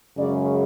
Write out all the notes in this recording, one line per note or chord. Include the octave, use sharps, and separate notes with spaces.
F#2 C#3 G#3 C#4 D5